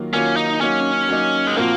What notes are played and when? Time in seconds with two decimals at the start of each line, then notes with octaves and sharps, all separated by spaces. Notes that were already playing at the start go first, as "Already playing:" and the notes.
Already playing: D#3 F#3 A#3 F4
0.13 D#3 F#3 A#3 C#4 F4
0.36 D#4
0.61 F#3 A#3 C#4 D#4
1.09 F#3 A#3 D#4
1.47 G#3
1.57 A#2 F3 A#3 C4 F#4 A#4